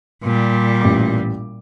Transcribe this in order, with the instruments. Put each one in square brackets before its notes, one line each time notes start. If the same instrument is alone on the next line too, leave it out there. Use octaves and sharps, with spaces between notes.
[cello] A#2 G3
[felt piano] A1 D6